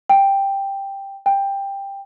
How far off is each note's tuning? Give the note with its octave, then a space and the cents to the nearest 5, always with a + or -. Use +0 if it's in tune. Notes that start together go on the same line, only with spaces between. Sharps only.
G5 +5
G5 +15